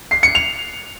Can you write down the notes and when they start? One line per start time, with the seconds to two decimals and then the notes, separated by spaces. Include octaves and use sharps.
0.11 C7
0.23 C#7
0.35 F7